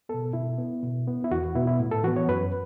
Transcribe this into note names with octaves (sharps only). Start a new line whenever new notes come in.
B2 B3 A4
B2 E4
B3
B2
B3
E4
E2 F#4
B2 B3 E4
E4
A2
A4
E3 B3 F#4
C#5
F#2 B4